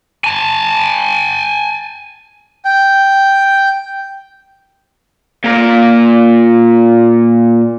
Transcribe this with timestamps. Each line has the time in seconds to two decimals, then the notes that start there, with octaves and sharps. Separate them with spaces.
0.24 G#5 A5
2.65 G5
5.44 A#2 A#4